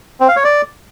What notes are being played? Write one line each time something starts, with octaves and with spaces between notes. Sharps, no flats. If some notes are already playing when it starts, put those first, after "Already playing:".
C4
F5
C#5
D5